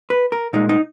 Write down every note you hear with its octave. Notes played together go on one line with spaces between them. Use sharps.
B4
A#4
A#2 G#3 D#4
D#4